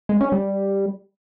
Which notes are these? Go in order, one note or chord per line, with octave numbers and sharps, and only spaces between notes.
G#3
C#4
G3